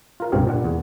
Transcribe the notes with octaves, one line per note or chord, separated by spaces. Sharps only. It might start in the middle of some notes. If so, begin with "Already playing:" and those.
F4 A#4 F5
C#2 G2 B2 C4 G4 F5
A#2 D4 F#5
E2